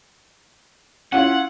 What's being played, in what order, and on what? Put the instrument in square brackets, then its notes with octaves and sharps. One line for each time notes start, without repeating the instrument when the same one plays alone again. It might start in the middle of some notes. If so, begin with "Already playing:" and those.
[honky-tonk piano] C#4 E4 F4 [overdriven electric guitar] F#5